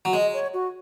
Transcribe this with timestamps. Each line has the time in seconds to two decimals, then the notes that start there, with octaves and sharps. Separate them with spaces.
0.05 F#3
0.13 G#3 D#5
0.33 C#5
0.54 F#4